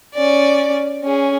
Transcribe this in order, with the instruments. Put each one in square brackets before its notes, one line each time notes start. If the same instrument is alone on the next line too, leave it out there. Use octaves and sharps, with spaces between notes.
[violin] C#4 D5
C#4 G#4